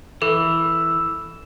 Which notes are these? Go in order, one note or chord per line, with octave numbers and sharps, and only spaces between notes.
E3 A4 E6